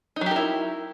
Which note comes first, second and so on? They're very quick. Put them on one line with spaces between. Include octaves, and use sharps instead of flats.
D#4 F#3 G4 A#4 E4